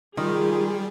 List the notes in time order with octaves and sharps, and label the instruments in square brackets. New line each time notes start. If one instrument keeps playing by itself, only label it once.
[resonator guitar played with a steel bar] D#3 [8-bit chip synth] G3 [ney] F4 [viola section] G#4